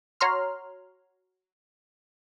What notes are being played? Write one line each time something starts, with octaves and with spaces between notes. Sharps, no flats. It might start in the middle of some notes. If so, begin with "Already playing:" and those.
F#4 C#5 A#5 C6 F6